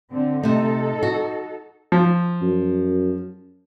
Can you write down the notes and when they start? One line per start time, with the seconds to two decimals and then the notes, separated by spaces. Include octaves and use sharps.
0.11 D3 C4
0.43 C3 A3 D#4 A4
1.03 F#4
1.92 F3
2.42 F#2